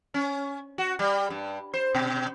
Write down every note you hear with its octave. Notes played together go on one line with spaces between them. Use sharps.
C#4
F#4
G3
G2
C5
B2